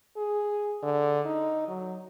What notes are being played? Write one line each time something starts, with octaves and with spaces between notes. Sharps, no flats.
G#4
D3
D#4
F#3